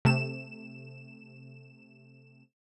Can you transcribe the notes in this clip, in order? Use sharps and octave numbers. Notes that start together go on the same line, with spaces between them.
C3 A3 E7